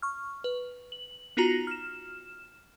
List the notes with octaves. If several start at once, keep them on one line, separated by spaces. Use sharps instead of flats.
C#6 F6
B4
F#7
B3 D#4 F4 F#4 A#5 A#6
F6 E7